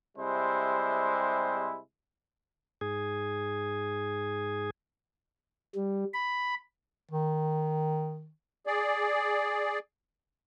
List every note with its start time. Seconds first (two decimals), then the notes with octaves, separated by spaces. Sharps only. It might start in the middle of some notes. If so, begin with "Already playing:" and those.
0.17 C3 G3 G#3 E4 C5
2.81 G#2 G#4
5.75 G3
6.14 B5
7.11 D#3
8.67 G#4 D5